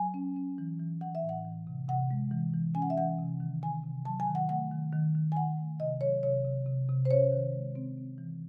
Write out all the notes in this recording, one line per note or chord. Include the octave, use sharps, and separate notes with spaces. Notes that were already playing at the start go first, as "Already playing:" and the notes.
Already playing: F#3 G#5
C#4
C#4
E3
E3
E3 F#5
E5
A2
F#5
E3
C3
C3 F#5
G#3
E3
E3
C#4 G#5
F#5
E5
E3 F#5
C3
D#3
D#3 G#5
C3
F#3 A5
G#5
D#3
F#5
A3 F#5
D#3
D#3
D#3
G#5
D#3 F#5
A3
C3 D#5
F#3 C#5
C3 C#5
C3
C3
C3
C5
C#4 C#5
D#3
G#3
C4
C4
E3